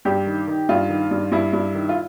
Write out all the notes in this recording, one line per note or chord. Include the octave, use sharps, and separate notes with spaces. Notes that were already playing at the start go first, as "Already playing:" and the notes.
G2 G4
D#3
D#3
G2 F4
D#3
G2
G2 E4
G2
D#3
F4